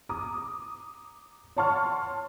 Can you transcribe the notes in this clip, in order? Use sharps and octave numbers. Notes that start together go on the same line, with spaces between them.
A#5 D6 D#6
C#5 F#5 A5 C6 C#6 F6